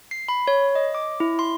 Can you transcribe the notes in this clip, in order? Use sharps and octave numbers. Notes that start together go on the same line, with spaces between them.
C7
B5
C#5
D#5
D6
E4
C6